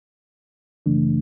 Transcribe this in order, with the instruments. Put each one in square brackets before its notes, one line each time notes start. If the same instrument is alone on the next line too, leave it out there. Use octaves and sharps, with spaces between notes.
[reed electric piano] F#2 C#3 E3 A3 D4